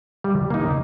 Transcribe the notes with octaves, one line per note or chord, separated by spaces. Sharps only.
G3
A#3 D#4